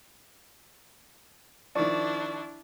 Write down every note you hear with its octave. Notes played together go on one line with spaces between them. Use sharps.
D#3 F3 D4 E4 D5 C#6